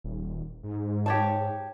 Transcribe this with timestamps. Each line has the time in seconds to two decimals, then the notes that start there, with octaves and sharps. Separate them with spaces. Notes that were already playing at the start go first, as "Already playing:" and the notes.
0.04 D#1
0.63 G#2
1.06 G4 C#5 A5